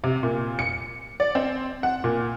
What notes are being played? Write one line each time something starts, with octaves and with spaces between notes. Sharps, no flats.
C3
A#2
C#7
D5
C4
F#5
A#2